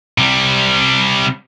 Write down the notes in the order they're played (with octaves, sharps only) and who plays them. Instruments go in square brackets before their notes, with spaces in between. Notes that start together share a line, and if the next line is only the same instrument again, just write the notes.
[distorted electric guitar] C3 G3